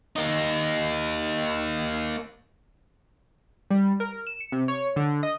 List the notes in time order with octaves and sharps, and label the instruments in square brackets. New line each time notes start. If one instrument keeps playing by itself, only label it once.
[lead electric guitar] A#3 D#4
[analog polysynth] G3
A#4
E7
C#7
C3
C#5
D3
D#5